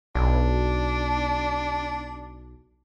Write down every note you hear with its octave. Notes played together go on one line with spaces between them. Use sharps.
B1 D4